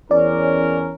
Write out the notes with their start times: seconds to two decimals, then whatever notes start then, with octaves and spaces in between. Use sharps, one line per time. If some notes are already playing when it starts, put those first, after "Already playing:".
0.11 E2 C#4 A#4 D5